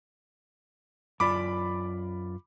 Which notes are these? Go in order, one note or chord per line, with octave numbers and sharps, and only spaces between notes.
F#2 F4 D5 B5 D6